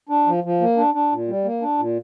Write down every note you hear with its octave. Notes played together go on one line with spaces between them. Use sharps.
D4
F3
F3
A#3
D4
D4
A#2
G3
A#3
D4
A#2